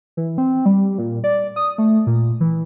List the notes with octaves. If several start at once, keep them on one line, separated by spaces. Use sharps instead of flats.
E3
C4
G3
A#2
D5
D#6
A3
A#2
E3